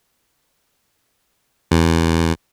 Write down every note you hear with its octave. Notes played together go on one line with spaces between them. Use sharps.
E2